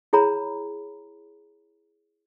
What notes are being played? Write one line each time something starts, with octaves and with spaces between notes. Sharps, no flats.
E4 G#4 C#5 A#5 B5